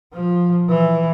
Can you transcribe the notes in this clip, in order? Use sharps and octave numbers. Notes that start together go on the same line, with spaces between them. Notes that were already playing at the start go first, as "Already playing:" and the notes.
F3
E3